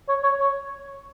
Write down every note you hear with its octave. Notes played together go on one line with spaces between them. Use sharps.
C#5
C#5
C#5